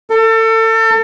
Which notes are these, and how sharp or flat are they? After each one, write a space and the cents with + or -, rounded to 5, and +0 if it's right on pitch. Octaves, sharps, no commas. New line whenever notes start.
A4 +30